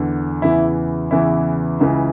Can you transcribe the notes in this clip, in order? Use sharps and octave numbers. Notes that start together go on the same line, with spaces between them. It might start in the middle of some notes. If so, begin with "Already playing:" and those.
Already playing: E2 D3
E2 C#3 E3 E4
E2 C#3 E3 E4
C#2 C#3 E3